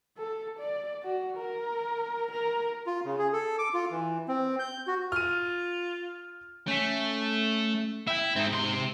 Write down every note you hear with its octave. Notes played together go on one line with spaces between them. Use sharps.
A4
D5
F#4
A#4
A#4
F4
C#3
G#4
A4
D6
F4
E3
C4
G6
F#4
F4 F6 D#7
A3 C#4 B6
E4 E5 G5
G#2 C4 D#4
C3 C6